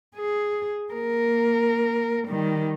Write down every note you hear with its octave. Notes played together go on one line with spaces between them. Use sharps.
G#4
A#3 A#4
D#3 G3